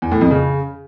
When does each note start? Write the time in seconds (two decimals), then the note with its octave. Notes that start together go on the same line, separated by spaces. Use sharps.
0.02 E2
0.12 A2
0.21 F2
0.31 C#3